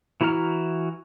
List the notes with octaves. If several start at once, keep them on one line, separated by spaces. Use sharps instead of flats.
E3 E4 F#4 A#5 F6